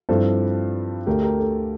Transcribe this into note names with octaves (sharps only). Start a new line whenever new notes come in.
G2 F3 C4 E4 A4 C5
D2 D3 A3 G4 A#4
G4 A#4
A4